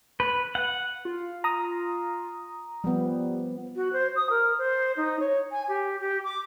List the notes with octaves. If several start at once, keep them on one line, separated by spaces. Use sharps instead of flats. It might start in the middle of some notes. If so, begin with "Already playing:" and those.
B4
F#5
F4
A#5 D#6
F3 G3 B3
F#4
C5
D#6
A#4
C5
D#4
C#5
G#5
G4
G4
D6